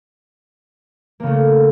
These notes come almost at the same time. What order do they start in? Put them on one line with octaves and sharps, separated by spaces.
A#3 C#3 A3